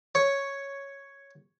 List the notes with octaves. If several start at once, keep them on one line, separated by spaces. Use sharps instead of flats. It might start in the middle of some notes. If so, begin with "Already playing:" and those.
C#5